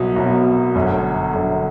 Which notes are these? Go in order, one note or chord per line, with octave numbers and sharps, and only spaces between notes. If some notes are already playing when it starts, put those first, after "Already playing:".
Already playing: C2 B2 F#3
C2 B2 F#3
G1 F#2 D3
G1 F#2 D3